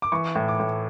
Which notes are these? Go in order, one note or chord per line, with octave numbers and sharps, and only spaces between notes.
D6
E3 C#6
A2
D6
A2